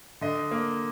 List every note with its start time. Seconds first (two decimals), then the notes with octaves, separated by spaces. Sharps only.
0.21 D3 D#5
0.51 A#3